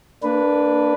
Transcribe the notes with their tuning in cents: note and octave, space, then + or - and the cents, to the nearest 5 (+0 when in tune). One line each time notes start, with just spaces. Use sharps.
A#3 -25 D4 +0 B4 +0